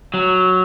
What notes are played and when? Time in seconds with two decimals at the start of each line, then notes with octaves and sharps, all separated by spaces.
0.14 F#3